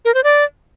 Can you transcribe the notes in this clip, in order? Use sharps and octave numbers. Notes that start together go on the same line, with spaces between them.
A#4
C5
D5